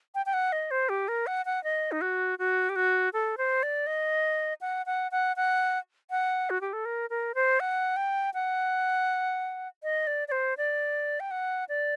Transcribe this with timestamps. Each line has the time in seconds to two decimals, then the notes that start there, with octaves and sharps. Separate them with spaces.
0.15 G5
0.26 G5
0.33 F#5
0.52 D#5
0.71 C5
0.89 G4
1.08 A#4
1.27 F#5
1.46 F#5
1.64 D#5
1.92 D#4
2.01 F#4
2.39 F#4
2.69 G4
2.76 F#4
3.13 A4
3.38 C5
3.63 D5
3.87 D#5
4.61 F#5
4.86 F#5
5.12 F#5
5.36 F#5
6.10 F#5
6.50 F#4
6.61 G4
6.73 A4
6.85 A#4
7.10 A#4
7.35 C5
7.60 F#5
7.97 G5
8.34 F#5
9.83 D#5
10.07 D5
10.28 D5
10.32 C5
10.58 D5
11.20 G5
11.31 F#5
11.69 D5